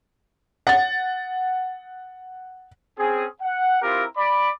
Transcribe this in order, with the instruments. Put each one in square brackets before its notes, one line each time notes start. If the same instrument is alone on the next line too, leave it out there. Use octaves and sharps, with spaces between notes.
[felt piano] F#5 A6
[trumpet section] C4 C#4 G#4
F#5
C4 E4 F4 G4 A#4
D5 B5